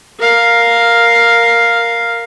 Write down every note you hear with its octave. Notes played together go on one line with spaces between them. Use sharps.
A#4 F5